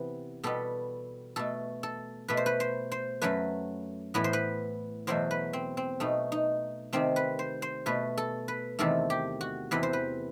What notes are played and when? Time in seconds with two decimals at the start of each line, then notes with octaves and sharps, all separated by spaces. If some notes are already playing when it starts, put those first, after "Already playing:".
Already playing: C3 E3 B3
0.43 B2 G3 B3 A4
1.36 B2 A3 A4
1.83 A4
2.28 B2 A3 B4
2.37 C5
2.46 B4
2.60 C5
2.92 C5
3.22 F#2 F#3 A3 B4
4.14 A2 E3 B3 B4
4.24 C5
4.33 B4
5.07 E2 B2 F#3 A3 C5
5.31 B4
5.53 C4
5.77 C4
6.00 B2 A3 D#4
6.32 D#4
6.93 C3 D#3 A3 C4
7.16 B4
7.39 C5
7.62 C5
7.86 B2 A3 B4
8.18 A4
8.48 B4
8.79 E2 C3 D#3 A3 A4
9.10 G4
9.41 F#4
9.71 E2 C3 E3 B4
9.83 C5
9.93 B4